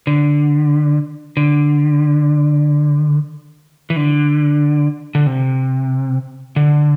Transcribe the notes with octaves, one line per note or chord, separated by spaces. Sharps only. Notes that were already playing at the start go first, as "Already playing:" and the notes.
D3
D3
E3
D3
D3
C3
D3